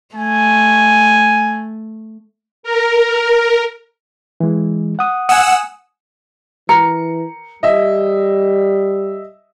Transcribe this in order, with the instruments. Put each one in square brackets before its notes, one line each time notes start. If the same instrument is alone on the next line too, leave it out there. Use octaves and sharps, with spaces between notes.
[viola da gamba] A3 [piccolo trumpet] G#5
[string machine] A#4
[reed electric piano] E3 G#3
F#5 D#6
[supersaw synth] F#5 E6 [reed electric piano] G#5 D#6
[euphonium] E3 [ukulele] A#4 [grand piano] C#7
[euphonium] G3 [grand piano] D#5 E5